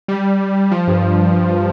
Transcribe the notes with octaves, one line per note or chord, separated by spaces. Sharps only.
G3
F3
G2